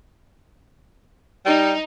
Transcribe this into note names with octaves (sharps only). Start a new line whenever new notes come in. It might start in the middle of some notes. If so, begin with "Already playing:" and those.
G3 D#4